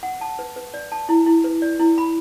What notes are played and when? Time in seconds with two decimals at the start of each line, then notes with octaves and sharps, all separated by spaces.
0.03 F#5
0.21 A5
0.39 B4
0.56 B4
0.74 D5
0.92 A5
1.09 E4
1.26 E4
1.44 B4
1.62 D5
1.80 E4
1.98 B5